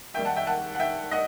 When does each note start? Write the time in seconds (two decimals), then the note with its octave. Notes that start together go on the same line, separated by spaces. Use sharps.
0.14 D#2 D#3 G3 E5 G5
0.25 F#5 A5
0.36 E5 G5
0.47 F#5 A5
0.75 F#5
0.80 E5 G5
1.11 D#5 F#5